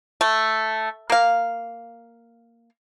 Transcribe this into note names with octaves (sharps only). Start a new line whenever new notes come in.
A3
A#3 F5